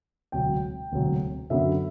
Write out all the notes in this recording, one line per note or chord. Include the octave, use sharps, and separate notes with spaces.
E1 D2 C3 F#3 G5
E1 D2 C3 F#3
F#2 D3 F#3 B3 E5